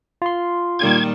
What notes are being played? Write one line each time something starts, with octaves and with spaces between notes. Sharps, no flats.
F4 C6
A#2 D#3 G3 G#6